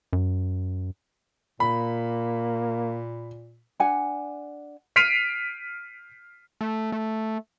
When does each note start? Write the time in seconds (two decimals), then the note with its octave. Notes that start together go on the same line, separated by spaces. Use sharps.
0.13 F#2
1.60 A#2 A#3 B5
3.80 D4 F#5 G#5
4.96 F6 B6 C7 D7 D#7 F7
6.61 A3
6.92 A3